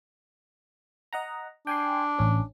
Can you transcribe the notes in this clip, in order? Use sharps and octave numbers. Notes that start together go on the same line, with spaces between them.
D#5 F#5 A#5
D4 G5 G#5 C6
A1 C#4